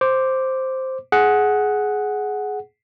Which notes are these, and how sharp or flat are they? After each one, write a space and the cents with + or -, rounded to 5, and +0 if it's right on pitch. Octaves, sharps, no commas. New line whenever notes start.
C5 +0 D6 +0
G#4 +15 F#5 +0